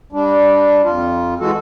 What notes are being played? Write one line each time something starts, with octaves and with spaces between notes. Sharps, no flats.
G3 D4
F2 F4
E3 G#3 F#4 A4